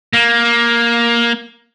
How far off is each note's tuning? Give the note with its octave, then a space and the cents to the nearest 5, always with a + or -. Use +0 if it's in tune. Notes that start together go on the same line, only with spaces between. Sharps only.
A#3 +10